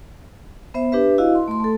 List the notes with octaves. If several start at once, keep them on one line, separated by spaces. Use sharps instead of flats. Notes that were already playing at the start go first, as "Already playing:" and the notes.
B3 C5 E5
D4 G4 B4 E5
E4 F#4 D#5 F5
C6
A3 C6
A3 A4